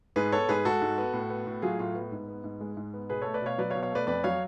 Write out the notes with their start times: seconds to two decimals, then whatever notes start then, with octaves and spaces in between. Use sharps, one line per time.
0.16 G#2 G#4 B4
0.32 B3 A4 C#5
0.49 G#2 G#4 B4
0.65 G#3 F#4 A4
0.82 G#2
0.98 B3
1.14 A2
1.30 B3
1.47 A2
1.62 F#3 F4 G#4
1.79 A2 F4
1.95 B3
2.12 G#2
2.28 B3
2.44 G#2
2.61 G#3
2.77 G#2
2.94 B3
3.09 B2 G#4 B4
3.22 A3 A4 C#5
3.34 B4 D5
3.42 B2 C#5 F5
3.58 F#3 B4 D5
3.70 C#5 F5
3.75 B2
3.83 C#5 F5
3.91 A3 B4 D5
4.07 F2 B4 D5
4.24 F#3 C#5 F5